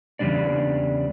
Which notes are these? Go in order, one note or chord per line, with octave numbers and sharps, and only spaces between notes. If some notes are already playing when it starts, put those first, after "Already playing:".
E2 C#3 E3 G3 D4 D5